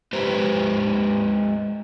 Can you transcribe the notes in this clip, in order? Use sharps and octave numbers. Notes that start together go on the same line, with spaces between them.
G#3 G4 B4 C5 E5 A#5